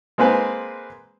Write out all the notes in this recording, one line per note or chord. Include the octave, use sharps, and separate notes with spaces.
G#3 A#3 C4 G#4 B4 G#5